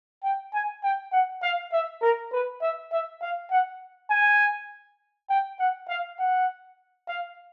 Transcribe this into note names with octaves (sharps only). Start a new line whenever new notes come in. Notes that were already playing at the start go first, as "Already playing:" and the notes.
G5
G#5
G5
F#5
F5
E5
A#4
B4
E5
E5
F5
F#5
G#5
G5
F#5
F5
F#5
F5